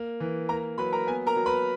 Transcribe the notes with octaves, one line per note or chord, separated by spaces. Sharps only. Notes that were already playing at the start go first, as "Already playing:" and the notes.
Already playing: A#3
E3
A#3 A#4 A#5
F#3 B4 B5
A#4 A#5
B3 G#5
A#4 A#5
F#3
B4 B5